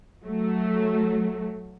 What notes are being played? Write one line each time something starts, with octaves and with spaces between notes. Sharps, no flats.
F#3 A3